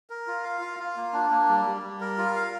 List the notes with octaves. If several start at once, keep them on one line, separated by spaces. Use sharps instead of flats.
A#4
F4
F5
F4
F4
A#3
D4
A#3
G3
G3
G3
A#4
F4
F5